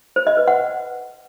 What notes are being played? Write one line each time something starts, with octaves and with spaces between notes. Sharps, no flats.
C5
D#5
B4
F#5